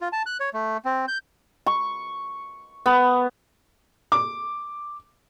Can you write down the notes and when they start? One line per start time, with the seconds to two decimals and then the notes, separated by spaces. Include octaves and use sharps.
0.01 F4
0.13 A5
0.26 F#6
0.40 C#5
0.54 A3
0.85 C4
1.08 G6
1.66 C#6
2.86 B3
4.12 D6